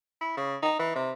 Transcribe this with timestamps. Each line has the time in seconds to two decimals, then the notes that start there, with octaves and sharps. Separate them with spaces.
0.21 E4
0.37 C#3
0.62 D#4
0.79 E3
0.95 C3